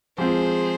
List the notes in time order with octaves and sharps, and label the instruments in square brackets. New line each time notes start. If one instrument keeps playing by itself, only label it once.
[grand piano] F3 G#3 C4 [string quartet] G#4 C5